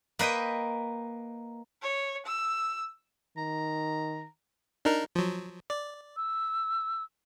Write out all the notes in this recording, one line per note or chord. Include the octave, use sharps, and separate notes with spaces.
A#3 B4 D#5 G5
C#5
E6
D#3 A#5
D4 D#4 A#4
F3 F#3
D5
E6